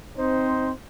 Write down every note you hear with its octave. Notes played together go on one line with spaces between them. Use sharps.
C4 D#4 C5